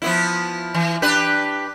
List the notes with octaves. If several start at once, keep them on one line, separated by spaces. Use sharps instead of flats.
F3 B3 E4
E3
D4 G4 B4